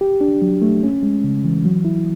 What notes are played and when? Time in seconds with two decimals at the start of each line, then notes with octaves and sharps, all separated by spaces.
0.01 G4
0.21 D4
0.42 F#3
0.62 A3
0.83 C#4
1.03 G#3
1.24 C#3
1.44 E3
1.65 F#3
1.85 E4